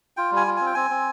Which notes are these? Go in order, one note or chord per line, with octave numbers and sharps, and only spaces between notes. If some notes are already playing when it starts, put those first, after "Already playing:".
F4 G5
G3
G#5
F4
G#5
C4
G5
C4 G#5
C4